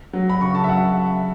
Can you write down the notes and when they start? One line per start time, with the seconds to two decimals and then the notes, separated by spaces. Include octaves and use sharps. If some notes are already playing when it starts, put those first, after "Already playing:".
0.13 F#3
0.30 B5
0.41 C#3 C#6
0.55 A5
0.64 E5
0.68 F#3 F#5